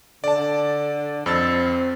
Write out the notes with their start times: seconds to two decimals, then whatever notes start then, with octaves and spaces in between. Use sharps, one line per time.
0.24 D3 D5 A5
1.26 F2 C4 E6 A6